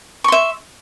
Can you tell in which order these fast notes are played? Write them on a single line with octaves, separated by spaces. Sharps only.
C#6 C6 E5